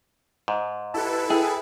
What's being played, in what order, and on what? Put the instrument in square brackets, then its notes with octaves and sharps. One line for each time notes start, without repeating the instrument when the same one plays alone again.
[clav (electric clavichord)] G#2
[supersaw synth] E4 A4 B4 [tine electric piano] G4 A5
[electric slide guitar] G#4 [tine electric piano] E5 G5